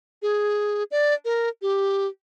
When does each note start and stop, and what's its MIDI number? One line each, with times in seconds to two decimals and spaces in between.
0.22 0.84 68
0.91 1.14 74
1.25 1.49 70
1.62 2.07 67